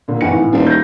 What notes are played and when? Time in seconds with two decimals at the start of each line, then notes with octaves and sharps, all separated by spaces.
0.08 A#2 D3
0.21 G#1 E3 F#5 C#7
0.38 A2
0.52 D#1
0.67 G6 A#6